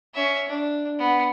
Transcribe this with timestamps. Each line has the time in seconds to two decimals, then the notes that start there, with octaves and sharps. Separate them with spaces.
0.14 C#4 E5
0.48 D4
0.98 B3